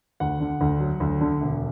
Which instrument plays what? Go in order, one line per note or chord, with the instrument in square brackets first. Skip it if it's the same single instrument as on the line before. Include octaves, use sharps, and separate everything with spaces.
[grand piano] D2 F#5
D3
D2
F#3
D2
D3
E1